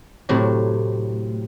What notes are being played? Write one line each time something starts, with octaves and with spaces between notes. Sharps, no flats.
A2 C3 F#3